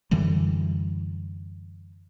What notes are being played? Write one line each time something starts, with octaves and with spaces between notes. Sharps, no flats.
F#2 D3 E3 G3